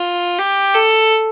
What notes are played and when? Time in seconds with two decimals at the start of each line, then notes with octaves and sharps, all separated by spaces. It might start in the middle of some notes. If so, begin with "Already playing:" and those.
Already playing: F4
0.39 G4
0.74 A4